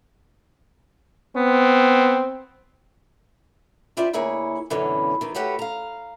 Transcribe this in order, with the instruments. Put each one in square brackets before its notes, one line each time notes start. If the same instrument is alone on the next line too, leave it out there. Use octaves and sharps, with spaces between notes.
[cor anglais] B3 [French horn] C4
[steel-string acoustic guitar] E4 F4 G4 C5 D5 E5
D2 A#3 E4 G#4 C#5
F#2 B2 D3 E3 C#4
D#3 E3
A3 F#4 G4 B4 C#5
F5 A#5